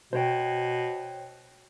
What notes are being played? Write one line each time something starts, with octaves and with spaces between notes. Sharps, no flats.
B2 C5 C#5 G5